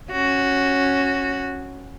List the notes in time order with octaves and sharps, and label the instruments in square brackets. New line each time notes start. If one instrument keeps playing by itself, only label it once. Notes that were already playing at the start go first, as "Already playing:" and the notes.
[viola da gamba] C#4 F#4